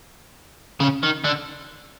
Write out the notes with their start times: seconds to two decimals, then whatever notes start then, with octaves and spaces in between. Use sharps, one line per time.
0.80 C#3
1.03 D#3
1.24 D3